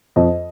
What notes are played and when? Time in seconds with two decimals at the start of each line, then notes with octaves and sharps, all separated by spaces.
0.16 F2 D#5